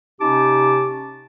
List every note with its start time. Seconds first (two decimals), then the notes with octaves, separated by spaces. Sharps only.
0.20 C3 C#4 D#4 G4 A5 D6